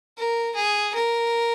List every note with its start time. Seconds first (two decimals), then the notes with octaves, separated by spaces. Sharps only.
0.18 A#4
0.55 G#4
0.94 A#4